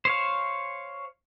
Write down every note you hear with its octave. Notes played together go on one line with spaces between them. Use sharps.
C5 C#5 F5